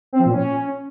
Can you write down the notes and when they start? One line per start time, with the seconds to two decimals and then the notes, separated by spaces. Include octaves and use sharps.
0.13 C4
0.19 F3
0.26 A#2
0.32 C#4